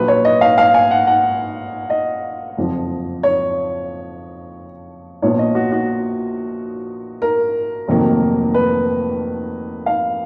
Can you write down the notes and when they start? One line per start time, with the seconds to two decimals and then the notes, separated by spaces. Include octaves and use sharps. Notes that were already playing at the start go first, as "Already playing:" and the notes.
Already playing: A#1 A#2 F#3 B4
0.08 C#5
0.25 D#5
0.41 F5
0.58 F5
0.74 G#5
0.91 F#5
1.07 F#5
1.90 D#5
2.57 F#1 F2 F3
3.23 C#5
5.22 A#1 A#2 F3 B3 C#5
5.39 D#5
5.55 F#4
5.72 F#4
7.22 A#4
7.88 F1 F2 D#3 F#3 A#3
8.54 B4
9.86 F5